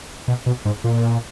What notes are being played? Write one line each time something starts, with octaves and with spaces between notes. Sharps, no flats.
B2
B2
G#2
A#2